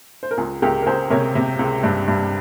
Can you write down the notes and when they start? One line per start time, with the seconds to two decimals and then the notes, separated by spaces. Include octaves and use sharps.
0.23 C5
0.31 A#4
0.37 C#2 F4 G#4
0.62 C#2 G4 A#4
0.82 A#4
0.86 C#2 G#4 C5
1.10 C3 A#4 C#5
1.35 C3
1.59 C#2
1.83 G2
2.08 G2